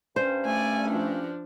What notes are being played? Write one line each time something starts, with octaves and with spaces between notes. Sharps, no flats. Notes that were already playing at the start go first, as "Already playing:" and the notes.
G2 C#4 C5
A3 D5 G#5
F3 D4